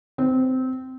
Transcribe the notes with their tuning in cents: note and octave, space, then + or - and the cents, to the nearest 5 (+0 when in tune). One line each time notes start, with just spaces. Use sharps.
C4 -20